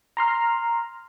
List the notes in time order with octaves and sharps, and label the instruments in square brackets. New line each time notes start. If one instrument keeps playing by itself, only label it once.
[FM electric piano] A#5 C6 F6